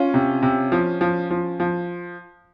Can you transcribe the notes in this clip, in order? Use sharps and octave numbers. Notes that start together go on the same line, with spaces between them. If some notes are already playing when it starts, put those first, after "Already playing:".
Already playing: C#4 F4
C3
C3
F3
F3
F3
F3